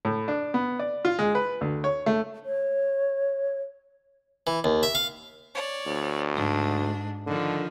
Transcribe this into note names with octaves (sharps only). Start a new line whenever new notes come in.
A2
D4
B3
D5
F4
G#3
B4
D2
C#5
A3
C#5
E3
D#2
E5
F5
C#5 D5
D2
G#2 D4
D3 D#3 F3